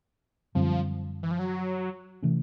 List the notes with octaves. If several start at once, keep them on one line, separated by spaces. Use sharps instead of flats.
F#2 D3 F3 G3 C4
E3
F3
F#3
C3 E3 A3 C#4